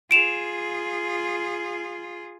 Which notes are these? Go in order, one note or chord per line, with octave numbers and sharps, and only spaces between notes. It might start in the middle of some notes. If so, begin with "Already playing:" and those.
F4 G#4 D7 E7 F7